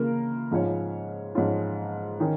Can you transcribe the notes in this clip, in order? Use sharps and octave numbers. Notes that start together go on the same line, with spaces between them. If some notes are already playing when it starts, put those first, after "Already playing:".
Already playing: C#3 A#3 F4 A#4
G#2 F3 C#4 F4 C#5
G#2 F3 C#4 F4 C#5
D#3 C#4